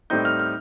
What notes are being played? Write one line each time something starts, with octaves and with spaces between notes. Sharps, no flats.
A2 G3 C4 D#4 G6
F6
F6